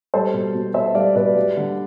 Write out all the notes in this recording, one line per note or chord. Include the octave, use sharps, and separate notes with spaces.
G3 A4 C5
B2
B2
B3 C5 E5
G3 D5 F5
B2 B4 D5
G3
D3